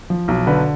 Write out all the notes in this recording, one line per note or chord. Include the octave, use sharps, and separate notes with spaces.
F3
B1
D3 B4